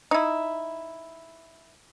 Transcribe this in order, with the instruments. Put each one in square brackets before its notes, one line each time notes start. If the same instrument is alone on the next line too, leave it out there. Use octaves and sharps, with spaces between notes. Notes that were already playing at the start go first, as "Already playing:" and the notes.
[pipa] D#4 E4